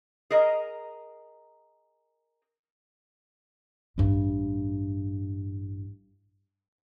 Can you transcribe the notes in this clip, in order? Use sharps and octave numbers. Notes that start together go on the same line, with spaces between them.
G#4 A#4 D#5 A#5
A1 G2